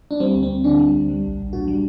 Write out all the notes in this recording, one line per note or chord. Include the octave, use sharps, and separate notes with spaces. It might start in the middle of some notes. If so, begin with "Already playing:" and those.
D4
G3 C4
D2
C4
D2
D3 D4
G3
D2
G3
A#1
A#1
A#2 F#4
G3